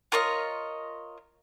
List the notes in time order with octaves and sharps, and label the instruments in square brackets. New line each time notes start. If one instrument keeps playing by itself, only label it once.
[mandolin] F4 A#4 C#5 D#5